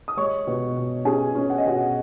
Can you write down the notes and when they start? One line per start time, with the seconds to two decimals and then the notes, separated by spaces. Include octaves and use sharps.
0.08 D#6
0.17 G#3 C#5 C#6
0.47 B2
0.77 B2
1.05 C#4 G#4 G#5
1.35 C#4
1.50 F#5
1.58 D#5
1.65 B2 F#4 F#5